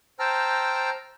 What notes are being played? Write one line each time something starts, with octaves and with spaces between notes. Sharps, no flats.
C5 G5 A5 A#5 E6 F6